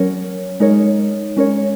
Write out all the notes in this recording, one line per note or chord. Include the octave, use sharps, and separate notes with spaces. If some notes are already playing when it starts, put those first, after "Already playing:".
Already playing: F#3 C#4 A#4 C#5
G#3 D#4 A#4 C#5
G#3 C#4 A#4 C#5